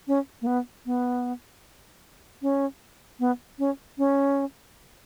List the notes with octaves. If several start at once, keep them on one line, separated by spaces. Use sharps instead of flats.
C#4
A#3
B3
B3
C#4
B3
C#4
C#4